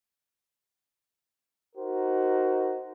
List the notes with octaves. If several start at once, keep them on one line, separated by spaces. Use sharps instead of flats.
D#4 F#4 A#4 C5